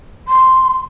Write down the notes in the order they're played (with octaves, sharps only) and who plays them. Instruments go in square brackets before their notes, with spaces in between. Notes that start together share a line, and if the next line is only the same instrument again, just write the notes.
[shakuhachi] C6